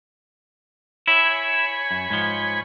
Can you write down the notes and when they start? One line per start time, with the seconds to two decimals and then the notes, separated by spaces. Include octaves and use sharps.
1.08 E4 C#5 G#5 B5
1.91 F#2
2.10 G#2 F3